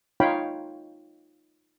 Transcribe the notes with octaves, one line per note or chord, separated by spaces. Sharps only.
D#4 F4 C#5 F5 G5 B5